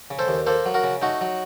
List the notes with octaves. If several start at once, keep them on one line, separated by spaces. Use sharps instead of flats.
C#3
A4 C5
D#2
A#3 A4 C5
F#3
F#4 A#4
C#3
A3 D#4 F#4
F#3